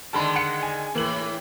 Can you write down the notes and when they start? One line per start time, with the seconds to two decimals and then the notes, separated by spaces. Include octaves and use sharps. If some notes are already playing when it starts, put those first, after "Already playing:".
0.13 D3 D#3 G#3 A5 B5 C6
0.35 F#5 C#7
0.63 G#5
0.95 A2 E3 A#3 F#7